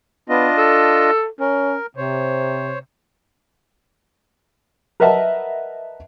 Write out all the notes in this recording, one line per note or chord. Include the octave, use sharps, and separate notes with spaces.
B3 D4 F4 D#5
A4
C#4 A#4
C3 C5 C#5
A#4 B4 D#5 E5 F#5 A5